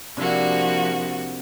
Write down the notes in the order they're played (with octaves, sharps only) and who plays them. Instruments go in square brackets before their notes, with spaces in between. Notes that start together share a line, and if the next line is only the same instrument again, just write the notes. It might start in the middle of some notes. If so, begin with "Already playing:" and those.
[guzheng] C3 D4 E4 [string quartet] F3 A#3 F#4